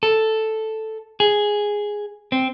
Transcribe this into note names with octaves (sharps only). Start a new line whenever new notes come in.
A4
G#4
C4